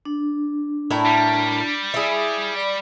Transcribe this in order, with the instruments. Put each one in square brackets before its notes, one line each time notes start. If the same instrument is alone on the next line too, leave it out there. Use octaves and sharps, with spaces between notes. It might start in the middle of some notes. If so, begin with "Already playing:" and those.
[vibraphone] D4
[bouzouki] A2 E4 A#4
[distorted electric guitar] G3
[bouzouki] E4 G#4
[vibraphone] D5 B5